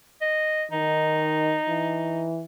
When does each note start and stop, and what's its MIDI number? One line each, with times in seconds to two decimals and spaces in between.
0.22 0.64 75
0.72 1.56 51
0.72 2.29 63
1.68 2.45 52